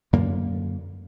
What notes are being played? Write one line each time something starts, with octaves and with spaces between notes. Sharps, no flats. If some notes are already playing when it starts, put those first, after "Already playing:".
F#2 D3 A#3